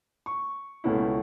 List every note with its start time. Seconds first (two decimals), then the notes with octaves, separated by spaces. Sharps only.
0.26 C#6
0.84 C#2 B2 A3 C#4 E4